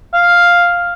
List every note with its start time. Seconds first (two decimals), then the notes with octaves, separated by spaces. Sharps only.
0.13 F5